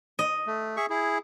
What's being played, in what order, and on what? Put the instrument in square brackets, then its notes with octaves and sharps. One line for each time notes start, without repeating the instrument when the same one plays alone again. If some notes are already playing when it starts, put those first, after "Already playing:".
[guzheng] D#5
[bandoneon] A3
G#4 E5 C#6
E4 G#4